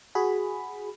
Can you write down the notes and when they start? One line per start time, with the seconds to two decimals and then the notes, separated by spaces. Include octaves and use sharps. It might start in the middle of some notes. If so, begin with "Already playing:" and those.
0.15 F#4 G#4 B5